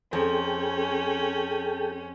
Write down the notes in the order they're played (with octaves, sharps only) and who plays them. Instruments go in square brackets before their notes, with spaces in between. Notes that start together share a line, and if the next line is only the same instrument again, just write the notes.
[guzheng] F2 [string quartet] C#4 [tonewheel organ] G#4 A4 G5